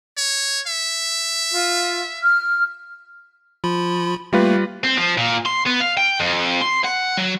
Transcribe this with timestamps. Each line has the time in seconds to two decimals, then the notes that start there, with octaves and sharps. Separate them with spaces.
0.17 C#5
0.67 E5
1.53 F4
2.23 F6
3.64 F3 F4 B5
4.33 G3 A3 A#3 F4 B4
4.84 C4
4.97 F3
5.17 A#2
5.46 C6
5.66 B3
5.81 F5
5.97 G5
6.20 F2
6.62 C6
6.85 F#5
7.17 F#3